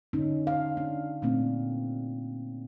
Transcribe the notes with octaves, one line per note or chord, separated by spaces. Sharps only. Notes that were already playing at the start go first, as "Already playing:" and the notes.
D3 C#4 D#4
F5
D4
A#2 A3 C4 D4